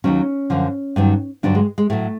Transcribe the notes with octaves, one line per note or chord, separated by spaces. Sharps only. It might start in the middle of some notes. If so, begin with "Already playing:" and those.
D#2 D#3 F#3 C#4
F#2 D3 F3
G2 D#3 F#3
G2 D3 F#3 D4
G#3
G#3
A2 F#3 A3